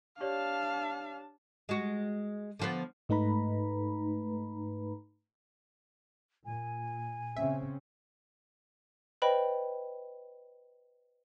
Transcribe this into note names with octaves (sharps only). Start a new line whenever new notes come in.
D4 G4 C#5 D5 F5 A5
G#3 F#4
D3 F3 B3
G#2 A3 D#4 B4 A#5 B5
A#2 G#5
C#3 C4 C#4 E5
B4 C5 D5 D#5 G5 B5